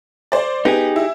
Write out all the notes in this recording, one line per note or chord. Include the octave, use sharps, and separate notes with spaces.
C5 D5
B3 D#4 G4 G#4
E4